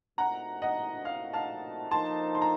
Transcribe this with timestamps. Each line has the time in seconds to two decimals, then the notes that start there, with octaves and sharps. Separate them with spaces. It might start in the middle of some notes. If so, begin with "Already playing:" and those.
0.18 A#2 A3 C4 D#4 F#4 F#5 A#5
0.62 D#5 F#5
1.05 F5
1.33 F5 A5
1.90 F3 A#3 D#4 A4 C5 A5 C6
2.35 C6
2.42 A#5